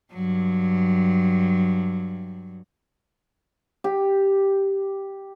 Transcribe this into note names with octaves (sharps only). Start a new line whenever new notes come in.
G2 F#3
G4